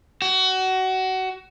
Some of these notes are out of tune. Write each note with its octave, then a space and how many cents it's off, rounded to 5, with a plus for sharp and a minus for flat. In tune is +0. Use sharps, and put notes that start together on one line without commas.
F#4 +25